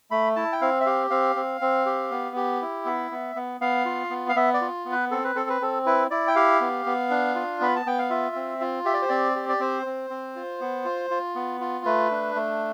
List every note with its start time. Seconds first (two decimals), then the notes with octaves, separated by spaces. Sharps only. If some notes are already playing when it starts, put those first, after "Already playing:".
0.11 A3 B5
0.36 E4 A5
0.52 G5
0.61 C4 F5
0.81 E5
0.86 G4 F5
1.10 C4 F5
1.36 C4
1.61 C4
1.86 G4
2.11 B3
2.36 G4
2.61 E4
2.85 B3 E5
3.11 B3
3.36 B3
3.61 B3 F5
3.85 F4
4.10 B3
4.29 F5
4.36 B3 E5
4.54 D5
4.61 F4
4.85 B3
4.92 B4
5.11 C4 A4
5.24 B4
5.35 C4 A4
5.50 B4
5.61 C4 A4
5.86 E4 B4
6.11 E4 D5
6.28 G5
6.36 G4 F5
6.61 B3
6.86 B3
7.10 D4
7.35 F4
7.61 B3 B5
7.76 A5
7.86 B3 G5
7.99 F5
8.10 F4 E5
8.36 C4
8.61 F4
8.85 G4 E5
8.94 D5
9.02 C5
9.09 C4 D5
9.36 G4
9.49 D5
9.60 C4 C5
9.86 C4
10.10 C4
10.36 F4
10.61 B3
10.85 F4
11.10 F4
11.35 B3
11.61 F4
11.85 A3 B4
12.11 D4
12.35 A3